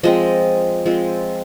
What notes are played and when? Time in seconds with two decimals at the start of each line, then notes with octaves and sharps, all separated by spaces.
0.03 F3 G#3 C4 D#5
0.86 F3 G#3 C4